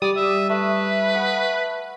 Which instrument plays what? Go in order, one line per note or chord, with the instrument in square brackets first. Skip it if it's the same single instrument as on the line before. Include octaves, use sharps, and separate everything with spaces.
[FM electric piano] G3 D#6 [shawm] D5
[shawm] E5
[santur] A3 [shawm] B4
[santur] F#5